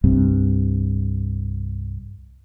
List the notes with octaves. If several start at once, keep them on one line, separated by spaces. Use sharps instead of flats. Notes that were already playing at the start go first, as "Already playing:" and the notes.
C2 G2 C3